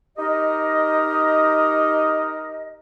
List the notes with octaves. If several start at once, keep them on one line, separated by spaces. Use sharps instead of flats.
D#4 G4 A#4 D#5